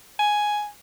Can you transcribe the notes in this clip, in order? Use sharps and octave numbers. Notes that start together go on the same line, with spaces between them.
G#5